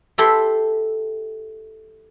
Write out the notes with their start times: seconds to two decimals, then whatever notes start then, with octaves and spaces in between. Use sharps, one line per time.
0.18 E4 G4 A4 B5 C6